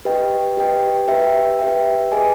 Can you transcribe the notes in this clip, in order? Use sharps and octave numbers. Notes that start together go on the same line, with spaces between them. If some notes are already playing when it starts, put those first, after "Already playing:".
G4 B4 D#5 G5
G4 B4 D#5 G5
G4 B4 E5 G5
G4 B4 E5 G5
G#4 B4 D#5 G#5